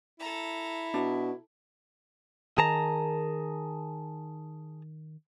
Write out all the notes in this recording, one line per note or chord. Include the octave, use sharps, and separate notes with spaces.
E4 A4 A#5
B2 D4
D#3 G#4 A5 A#5